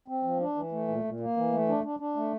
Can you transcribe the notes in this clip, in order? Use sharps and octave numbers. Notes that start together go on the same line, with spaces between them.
C4
F3
D4
E3
A3
A#2
A#2
A#3
E3
A3
D4
D4
D4
A3